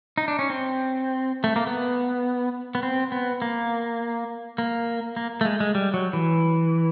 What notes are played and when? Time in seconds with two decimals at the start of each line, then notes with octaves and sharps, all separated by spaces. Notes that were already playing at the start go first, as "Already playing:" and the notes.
0.18 D#4
0.28 D4
0.39 C#4
0.50 C4
1.44 A3
1.56 A#3
1.67 B3
2.75 B3
2.83 C4
3.12 B3
3.42 A#3
4.58 A#3
5.16 A#3
5.41 A3
5.45 G#3
5.60 G#3
5.75 G3
5.94 F#3
6.13 E3